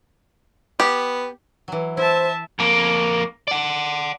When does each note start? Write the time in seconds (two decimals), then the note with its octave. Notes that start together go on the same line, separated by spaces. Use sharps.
0.80 B3 G4
1.68 E3 F#3
1.97 E4 C5 E5 A5
2.59 F2 A#3
3.48 D5 F#5